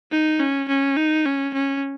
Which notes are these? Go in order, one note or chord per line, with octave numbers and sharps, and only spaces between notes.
D#4
C#4
C#4
D#4
C#4
C#4